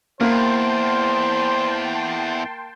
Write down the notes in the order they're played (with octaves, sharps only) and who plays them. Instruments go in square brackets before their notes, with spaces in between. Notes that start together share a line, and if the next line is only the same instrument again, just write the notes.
[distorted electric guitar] E2 [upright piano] A#3 [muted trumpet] C5 [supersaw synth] G5 A5 C6